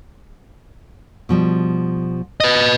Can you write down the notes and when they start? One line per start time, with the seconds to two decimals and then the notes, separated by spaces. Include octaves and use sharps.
1.29 B2 F3 G3
2.40 B4 D#5